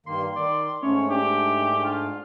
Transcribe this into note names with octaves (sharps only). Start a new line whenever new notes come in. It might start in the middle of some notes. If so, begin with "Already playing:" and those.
G2 D#3 A#3 C6
D#3 D5
G#2 A3 C#4 C#5
D4 G4
F4